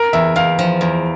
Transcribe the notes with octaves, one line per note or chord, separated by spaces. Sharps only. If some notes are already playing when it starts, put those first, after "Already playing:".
Already playing: A#4
E2 E5
E2 F5
F3
E2